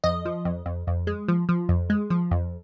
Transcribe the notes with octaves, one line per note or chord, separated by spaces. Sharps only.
F2 D#5
F3
F2
F2
F2
G#3
F3
F3
F2
G#3
F3
F2